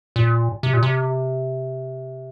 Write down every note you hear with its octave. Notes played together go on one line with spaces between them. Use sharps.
A#2
C3
A#2
C3